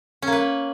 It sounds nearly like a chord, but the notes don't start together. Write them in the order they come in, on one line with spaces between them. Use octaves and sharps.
C#4 A#3 B4